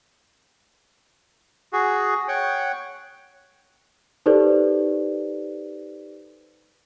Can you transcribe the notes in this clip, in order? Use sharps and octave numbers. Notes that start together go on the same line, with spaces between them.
F#4 G#4
C#5 F#5 G5
D#4 G4 A4 B4 C5 D5